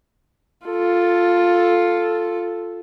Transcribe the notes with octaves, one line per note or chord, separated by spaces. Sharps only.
F4 A4